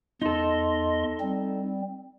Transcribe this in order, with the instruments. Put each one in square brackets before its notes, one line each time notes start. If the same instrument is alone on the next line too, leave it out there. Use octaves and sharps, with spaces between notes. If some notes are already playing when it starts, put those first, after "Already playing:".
[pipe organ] E2 D#5 C6 [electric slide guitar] D#4 A4
[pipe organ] G3 C4